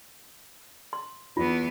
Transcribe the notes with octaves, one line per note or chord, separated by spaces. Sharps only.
C6
E2 B3 F4